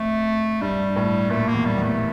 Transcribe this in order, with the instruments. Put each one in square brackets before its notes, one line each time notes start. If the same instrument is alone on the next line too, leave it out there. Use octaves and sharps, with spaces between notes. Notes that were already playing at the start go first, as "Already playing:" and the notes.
Already playing: [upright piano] F2 [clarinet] A3
[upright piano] G2 [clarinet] G3
[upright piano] A2
[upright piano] A#2 [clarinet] A3
[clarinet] A#3
[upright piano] E2
[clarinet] G3
[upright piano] E2
[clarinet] A3